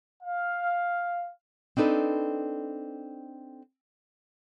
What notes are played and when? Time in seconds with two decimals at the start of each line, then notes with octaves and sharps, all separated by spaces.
0.23 F5
1.77 C4 D4 D#4 A4 B4